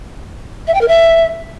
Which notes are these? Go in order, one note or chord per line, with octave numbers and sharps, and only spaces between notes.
E5
G5
A#4
E5